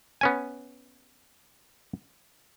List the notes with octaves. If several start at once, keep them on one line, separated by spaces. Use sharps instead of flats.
B3 C#4 G#5